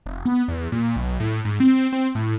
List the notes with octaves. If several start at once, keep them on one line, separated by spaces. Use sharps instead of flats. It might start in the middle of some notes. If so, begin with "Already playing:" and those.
F1
B3
E2
A#2
B1
A2
G#2
C4
C4
A2